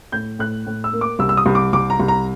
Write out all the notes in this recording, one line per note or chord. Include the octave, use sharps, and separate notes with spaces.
A2 G6
A2 F#6
A2
E6
A#3
D6
C2 E6
E6
D#6
C2
D6
C2 D6
A#5
C2
A#5